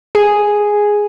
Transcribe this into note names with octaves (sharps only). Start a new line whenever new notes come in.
G#4